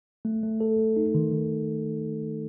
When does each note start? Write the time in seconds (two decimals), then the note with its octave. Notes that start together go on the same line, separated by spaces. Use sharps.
0.25 A3
0.43 A3
0.60 A4
0.79 A3
0.96 D#4
1.15 D#3
1.32 D#3